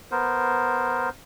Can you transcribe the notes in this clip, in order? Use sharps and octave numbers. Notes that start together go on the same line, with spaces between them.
B3 A#4 C5